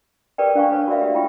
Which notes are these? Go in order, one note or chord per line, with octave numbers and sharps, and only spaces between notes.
G4 G#4 A#4 B4 D5 G5
D4 C5 F5 G#5 C#6
A4 B4 C#5
F#4 A#4 D5 E5 F5
G4 C#5
E4 F4 G5 C#6